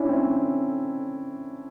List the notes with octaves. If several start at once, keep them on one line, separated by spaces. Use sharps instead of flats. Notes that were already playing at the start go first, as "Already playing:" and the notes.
Already playing: C#4 D4 E4
C4